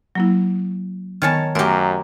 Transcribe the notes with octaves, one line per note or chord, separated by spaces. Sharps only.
F#3 A#3 E4
D#3 B3 C#5 G#5 A5 F6
F#2 A3 G4 A#4